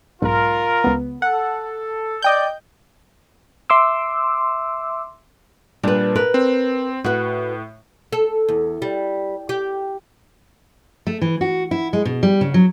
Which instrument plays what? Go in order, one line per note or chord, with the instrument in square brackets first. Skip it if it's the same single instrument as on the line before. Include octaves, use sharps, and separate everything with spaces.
[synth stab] B1 G#2 [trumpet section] F4 A#4
[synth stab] C#2 B3
[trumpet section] A4 [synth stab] F#5
[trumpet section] D5 [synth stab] D#5 G5 G6
[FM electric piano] E5 C6 D6 E6
[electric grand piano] A#2 D4 [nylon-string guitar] G3 B4
[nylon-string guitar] A#4 B4
[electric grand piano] C4
[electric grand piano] A2 [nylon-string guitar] F#4 B4
[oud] A4
E2
G3
G4
[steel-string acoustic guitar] A3
E3
F#4
E4
G#3
B2
G3
C#3
F#3